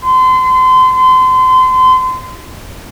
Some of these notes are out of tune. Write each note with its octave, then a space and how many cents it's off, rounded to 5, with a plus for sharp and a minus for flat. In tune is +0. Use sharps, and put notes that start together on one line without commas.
C6 -30